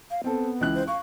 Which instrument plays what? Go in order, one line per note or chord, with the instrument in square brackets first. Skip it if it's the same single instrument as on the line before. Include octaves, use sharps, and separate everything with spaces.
[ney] F5
[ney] B3 [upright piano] C4 A4
[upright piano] C#2 E3 F#6
[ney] C5
[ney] F5 [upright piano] C#6